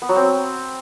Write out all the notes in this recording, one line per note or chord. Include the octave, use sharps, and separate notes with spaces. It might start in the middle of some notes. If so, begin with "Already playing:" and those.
B3
F#3
C4